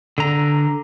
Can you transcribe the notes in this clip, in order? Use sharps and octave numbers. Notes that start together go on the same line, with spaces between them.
D3 A#5